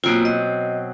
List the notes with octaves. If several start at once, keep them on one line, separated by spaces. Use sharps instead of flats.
B2 F#3 A#3 C4 F4
D#5